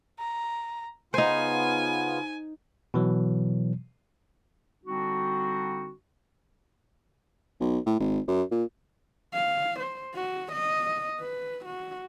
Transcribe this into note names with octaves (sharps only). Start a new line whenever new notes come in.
A#5
C#3 B3 D#4 F4 C5 G#5
B2 E3 F#3
D3 G3 C4 D4 D#4 F#4
B1
A2
G#1
F#2
A#2
F5
C5
F#4
D#5
B4
F#4